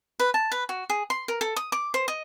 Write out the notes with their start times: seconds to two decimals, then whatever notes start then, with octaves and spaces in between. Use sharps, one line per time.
0.20 B4
0.34 A5
0.52 B4
0.69 F#4
0.90 G#4
1.10 C6
1.28 A#4
1.41 A4
1.56 D#6
1.72 D6
1.94 C5
2.08 D#5